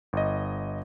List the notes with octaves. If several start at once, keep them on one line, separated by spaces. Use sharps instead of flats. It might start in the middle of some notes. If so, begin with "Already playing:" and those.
G1 D#5